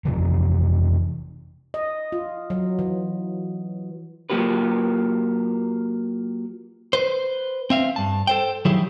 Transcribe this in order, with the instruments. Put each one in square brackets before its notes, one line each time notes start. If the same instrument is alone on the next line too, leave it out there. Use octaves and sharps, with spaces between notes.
[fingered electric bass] F2 C3 E3 F3
[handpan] D#5
F4
F#3
E3
[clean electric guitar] F#3 A#3 F4 G4 B4
B4 C5
C4 E5 F5
G2 A5
A4 C5 G5
D#3 F3 F#3 E4 G4 G#4